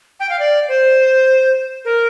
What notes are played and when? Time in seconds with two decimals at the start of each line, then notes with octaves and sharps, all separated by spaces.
0.20 G5
0.30 F5
0.39 D5
0.68 C5
1.85 A#4